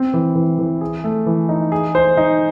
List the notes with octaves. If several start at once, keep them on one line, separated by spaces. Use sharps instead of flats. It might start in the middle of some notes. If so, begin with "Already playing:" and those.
Already playing: C4
E3
E3
E3
G#4
A3
E3
D#4
G#4
C5
D#4